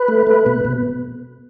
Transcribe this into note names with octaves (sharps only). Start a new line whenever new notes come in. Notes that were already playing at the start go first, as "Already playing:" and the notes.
Already playing: B4
A3
A3
B2
B2